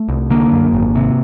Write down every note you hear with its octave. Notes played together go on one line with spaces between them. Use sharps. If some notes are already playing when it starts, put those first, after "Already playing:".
Already playing: A3
C2
D3 A#3
F#2
G#1
C3